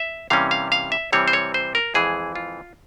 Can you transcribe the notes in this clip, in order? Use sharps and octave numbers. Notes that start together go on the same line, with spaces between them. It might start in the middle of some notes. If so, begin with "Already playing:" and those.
Already playing: E5
C3 E3 G3 A#3 C#4 F5
F5
F5
E5
C3 E3 G3 C4 C#5
C5
C#5
C5
A#4
F2 E3 G#3 G#4
F4